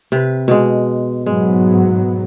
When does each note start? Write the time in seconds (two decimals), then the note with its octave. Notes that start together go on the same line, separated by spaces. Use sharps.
0.12 C3 B4
0.48 B2 G#3
1.26 G#2 F#3 G#3 B3